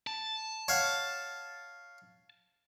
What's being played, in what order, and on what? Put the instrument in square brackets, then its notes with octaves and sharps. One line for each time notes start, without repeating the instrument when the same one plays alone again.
[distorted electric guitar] A5
[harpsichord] C#5 F5 F#5